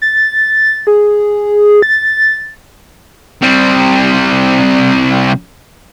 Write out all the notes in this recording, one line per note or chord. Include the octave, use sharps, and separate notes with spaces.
A6
G#4
A6
C3 G3